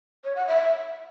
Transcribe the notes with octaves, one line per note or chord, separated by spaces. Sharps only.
C#5
F#5
E5